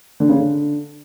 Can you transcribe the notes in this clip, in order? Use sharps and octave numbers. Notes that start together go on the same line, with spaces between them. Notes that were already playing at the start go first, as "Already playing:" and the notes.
D3
C#3
D3